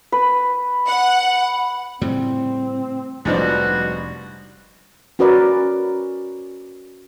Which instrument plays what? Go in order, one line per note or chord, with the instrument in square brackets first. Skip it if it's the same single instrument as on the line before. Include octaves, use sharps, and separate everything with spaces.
[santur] B4
[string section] F#5
[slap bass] A2 C#3 G3 [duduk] C4
[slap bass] F1 [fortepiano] G#2 F3 D4 [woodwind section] B2 F#4 [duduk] G3
[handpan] C#4 F#4 A#4 B4 D5